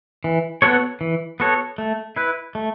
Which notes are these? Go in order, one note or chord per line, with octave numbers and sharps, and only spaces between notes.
E3
B3 F#4 A4 C#5
E3
B3 F#4 A4 C#5
A3
E4 B4
A3